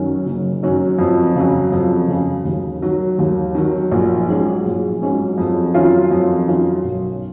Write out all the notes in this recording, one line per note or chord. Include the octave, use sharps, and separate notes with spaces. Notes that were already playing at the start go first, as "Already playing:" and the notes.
Already playing: F#2 D#3 F#3 C#4
F#1
F#2 D#3 F#3 C#4
F2
C#3 F#3
F2
C#3 F#3
D#2
D#3 F#3
D#2
D#3 F#3
A#1
G#2 F#3 C#4 G#4
A#1
G#2 F#3 C#4 G#4
F2
D#3 F#3 C#4 F4
F2
D#3 F#3 C#4 F4
B1